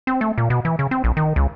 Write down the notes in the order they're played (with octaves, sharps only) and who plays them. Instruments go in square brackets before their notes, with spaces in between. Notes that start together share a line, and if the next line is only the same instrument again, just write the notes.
[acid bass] C4
A3
A#2
B2
E3
C#3
C4
A#1
D#3
C#2